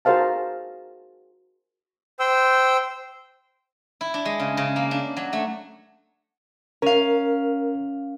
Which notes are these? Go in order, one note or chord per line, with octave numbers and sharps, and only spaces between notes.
F#4 G#4 A#4 C5 F5 A5
C5 G5 E6
E4
D4
G#3
C#3
C#3
A#3
D4
F#3
A3
C#4 A#4 F5